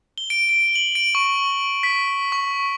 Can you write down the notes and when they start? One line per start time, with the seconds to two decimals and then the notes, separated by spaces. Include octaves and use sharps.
0.18 G7
0.30 D7
0.49 D7
0.75 F#7
0.95 D7
1.15 C#6
1.83 B6
2.32 C#6